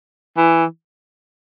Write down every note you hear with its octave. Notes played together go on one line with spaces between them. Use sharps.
E3